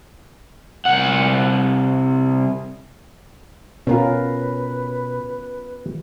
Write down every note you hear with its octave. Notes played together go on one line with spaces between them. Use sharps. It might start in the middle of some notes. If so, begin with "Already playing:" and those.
C2 F#5
B2 B3 C#4 F4 A#4 B4